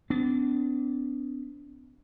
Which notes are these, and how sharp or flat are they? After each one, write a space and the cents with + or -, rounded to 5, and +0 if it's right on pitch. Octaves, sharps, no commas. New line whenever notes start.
B3 +40 D4 -25